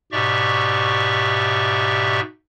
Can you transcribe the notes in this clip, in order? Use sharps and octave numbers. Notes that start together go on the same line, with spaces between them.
G#2 B2 G4 D5 E5 C#6